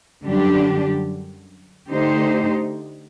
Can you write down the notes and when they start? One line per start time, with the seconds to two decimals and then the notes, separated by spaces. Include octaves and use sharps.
0.24 F#2 D3 G3 D4 G4
1.91 D3 A3 D#4 G4 C5